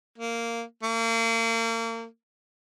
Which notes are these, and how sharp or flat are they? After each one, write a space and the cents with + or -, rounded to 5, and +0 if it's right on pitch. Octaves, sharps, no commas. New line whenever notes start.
A#3 -10
A#3 -35